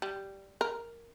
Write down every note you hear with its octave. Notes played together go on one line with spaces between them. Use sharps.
G3
A#4